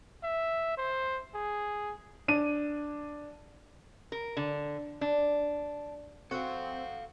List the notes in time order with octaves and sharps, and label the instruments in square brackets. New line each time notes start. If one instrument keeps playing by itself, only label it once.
[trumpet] E5
C5
G#4
[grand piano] D4 D#7
[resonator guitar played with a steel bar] A#4
D3
D4
[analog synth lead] C4 [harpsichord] F#4 [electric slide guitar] A4 F5